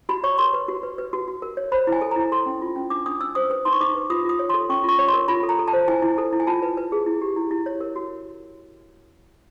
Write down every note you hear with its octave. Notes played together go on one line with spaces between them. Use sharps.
F#4 B5
C#5 C#6
A#4 C6
B4
F#4
B4
B4
F#4
F#4
A#4
C#5
C5 B5
E4
G#5
A4
E4 A#5
A4 C6
C#4
F4
C#4
D4 D6
D4 D#6
D4 E6
C5 D#6
B4 D#6
D#4 C6
C#6
D#4 D6
B4
F4 D#6
F4 D#6
C#5
A4 C6
C#4 C#6
F4 C#6
C#5
C6
A#4
F4 B5
A4
A#5
A4
A5
C5
E4 G#5
E4
A4
E4
G#5
F4 A5
B4
B4
G#4
E4
G4
E4
E4
C#5
A#4
F#4